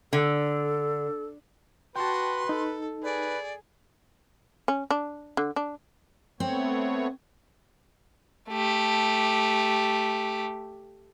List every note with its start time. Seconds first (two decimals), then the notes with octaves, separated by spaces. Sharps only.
0.13 D3 A4
1.96 F#4 B4 G5 A5 C6
2.49 D#4 A4
3.04 G#4 B4 D5
4.68 C#4
4.91 D4
5.37 D3
5.56 D4
6.40 A3 B3 C4 C#5
8.50 A3 G4